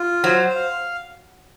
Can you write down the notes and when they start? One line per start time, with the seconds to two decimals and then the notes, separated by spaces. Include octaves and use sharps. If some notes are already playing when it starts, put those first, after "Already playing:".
Already playing: F4
0.24 F#3 C5
0.55 F5